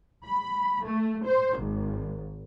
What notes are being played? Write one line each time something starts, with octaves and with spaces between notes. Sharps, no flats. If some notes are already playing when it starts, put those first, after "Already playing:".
B5
A3
C5
G#1